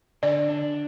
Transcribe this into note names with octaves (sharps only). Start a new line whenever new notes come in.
D3 D5
D4